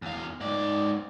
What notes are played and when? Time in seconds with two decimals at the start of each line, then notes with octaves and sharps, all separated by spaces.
0.02 E2 F5
0.40 G#2 D5